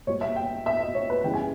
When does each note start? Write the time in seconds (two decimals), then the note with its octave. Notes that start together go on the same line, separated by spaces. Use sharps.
0.07 A#2 G3 C#5
0.21 E5
0.36 G5
0.66 E5
0.81 D#5
0.94 C#5
1.10 B4
1.24 C#3 E3 G3 G5
1.34 G#5